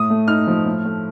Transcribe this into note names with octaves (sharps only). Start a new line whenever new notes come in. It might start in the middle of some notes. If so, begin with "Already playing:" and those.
Already playing: A2 D#6
A3
D#4 F6
F3
A2
A3